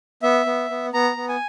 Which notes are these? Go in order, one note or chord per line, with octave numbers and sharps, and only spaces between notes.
B3 E5
B3
B3
B3 A#5
B3
G#5